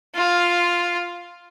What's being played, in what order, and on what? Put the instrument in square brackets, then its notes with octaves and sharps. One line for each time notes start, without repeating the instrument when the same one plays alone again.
[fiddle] F4